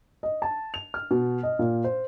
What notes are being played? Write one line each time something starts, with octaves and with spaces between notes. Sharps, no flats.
D#5
A5
F7
F6
B2
D#5
A#2
C5